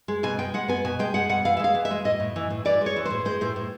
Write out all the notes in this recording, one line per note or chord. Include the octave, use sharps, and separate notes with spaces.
G#3
B2 G#5
G#3 G5
G#3 F#5
B3 G#5
B2 G#5
G#3 G5
G#3 F#5
B2 F#5
E3 F5
E5
G#3 F5
E3
E5
G#3
A2 D#5
A2
E3
A2
E3 D5
G#3
C#5
E3
A2 C5
G#3 C5
A2 C5
A2